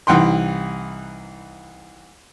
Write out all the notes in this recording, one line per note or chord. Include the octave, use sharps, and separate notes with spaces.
C2 E3 D#4 F#5 G5 C6